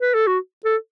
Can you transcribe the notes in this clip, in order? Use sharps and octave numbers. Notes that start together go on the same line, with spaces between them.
B4
A4
F#4
A4